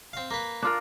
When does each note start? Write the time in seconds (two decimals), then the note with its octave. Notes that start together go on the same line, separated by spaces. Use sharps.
0.13 C4 F5
0.31 A#3 B4
0.62 D4 F4 A#4